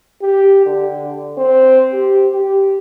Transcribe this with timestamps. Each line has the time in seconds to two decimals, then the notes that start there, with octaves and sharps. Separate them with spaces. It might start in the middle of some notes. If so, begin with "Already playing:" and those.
0.22 G4
0.66 D3
1.38 C4
1.93 G4
2.34 G4